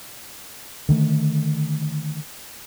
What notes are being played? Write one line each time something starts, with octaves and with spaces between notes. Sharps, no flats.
D3 D#3 A3